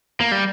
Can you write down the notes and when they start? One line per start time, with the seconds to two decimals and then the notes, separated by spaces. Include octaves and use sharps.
0.20 A#3
0.32 G3